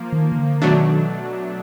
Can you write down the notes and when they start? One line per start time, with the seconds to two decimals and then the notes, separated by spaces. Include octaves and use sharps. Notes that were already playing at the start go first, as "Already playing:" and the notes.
Already playing: F3 A#3
0.12 D#3
0.32 D#3
0.36 D3
0.61 B2 D#3 F#3 A3 D4